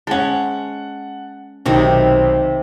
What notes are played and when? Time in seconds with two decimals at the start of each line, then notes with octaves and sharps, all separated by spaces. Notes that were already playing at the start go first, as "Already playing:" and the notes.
0.07 G#3 C#4 F#5 A5
1.66 B1 C3 D#3 D#4